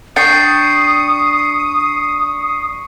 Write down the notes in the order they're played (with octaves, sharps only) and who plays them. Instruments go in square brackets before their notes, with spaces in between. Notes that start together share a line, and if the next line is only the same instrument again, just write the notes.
[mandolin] D4 G5 [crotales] C#6 C7 C#7 [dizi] D#6